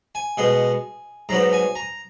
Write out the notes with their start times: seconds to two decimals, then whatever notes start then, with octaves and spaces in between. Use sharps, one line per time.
0.15 G#5
0.37 B2 G#3 B3
1.29 G#2 F#3 B3 A#5
1.53 G#5
1.75 A#5